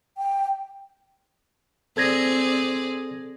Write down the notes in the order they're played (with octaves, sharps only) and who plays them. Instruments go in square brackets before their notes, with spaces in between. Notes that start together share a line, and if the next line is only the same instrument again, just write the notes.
[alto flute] G5
[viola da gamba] C4 G#4 D5 [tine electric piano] A4 G#6 A#6